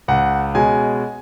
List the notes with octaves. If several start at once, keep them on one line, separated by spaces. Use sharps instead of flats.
C#2 F#5
B2 G#3 C#4 G#5